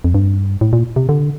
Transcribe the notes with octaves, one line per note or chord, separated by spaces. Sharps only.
F2
G2
A2
A#2
C3
D3